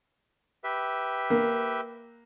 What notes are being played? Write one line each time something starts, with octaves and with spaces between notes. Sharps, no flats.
G4 B4 E5
A#3